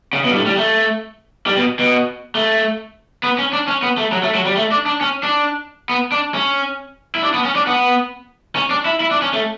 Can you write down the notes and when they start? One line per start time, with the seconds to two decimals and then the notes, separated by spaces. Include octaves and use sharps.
0.13 C#3
0.24 B2
0.30 G2
0.35 A2
0.46 G3
0.57 A3
1.46 G3
1.57 B2
1.79 B2
2.35 A3
3.23 B3
3.39 C#4
3.53 D4
3.68 C#4
3.83 B3
3.98 A3
4.12 F#3
4.23 A3
4.35 F#3
4.45 G3
4.57 A3
4.71 D4
4.86 D4
5.01 C#4
5.23 D4
5.89 B3
6.12 D4
6.34 C#4
7.15 E4
7.23 D4
7.34 B3
7.45 C#4
7.55 D4
7.67 B3
8.56 C#4
8.70 D4
8.85 E4
9.00 E4
9.11 D4
9.22 C#4
9.33 A3